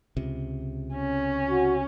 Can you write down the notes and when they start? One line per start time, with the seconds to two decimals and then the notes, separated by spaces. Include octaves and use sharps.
0.17 C#2 C3
0.95 C#4
1.50 F#4